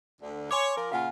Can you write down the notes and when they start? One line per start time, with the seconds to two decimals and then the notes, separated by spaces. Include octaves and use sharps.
0.21 D2 D3
0.51 C#5 G#5 C6 D6
0.77 F3 A#4
0.92 A#2 C#3 F4 F5 F#5 G#5